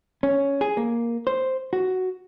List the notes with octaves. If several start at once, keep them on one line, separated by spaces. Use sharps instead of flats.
C#4
G#4
A#3
C5
F#4